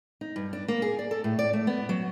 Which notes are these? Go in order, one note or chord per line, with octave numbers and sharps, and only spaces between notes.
D#4
G2
D4
A#3
G#4
D5
A4
A2
D5
A3
B3
F#3